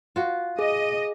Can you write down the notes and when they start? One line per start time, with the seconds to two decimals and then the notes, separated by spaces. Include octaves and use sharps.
0.16 F4 F#4
0.59 G#4 D#5